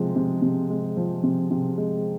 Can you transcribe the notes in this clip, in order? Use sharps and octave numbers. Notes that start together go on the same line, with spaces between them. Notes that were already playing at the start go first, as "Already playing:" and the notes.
Already playing: C3 F3 G#3
C3
C3
G#3
F3
C3
C3
G#3